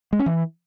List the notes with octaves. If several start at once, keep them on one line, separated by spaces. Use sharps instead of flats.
G#3
C#4
E3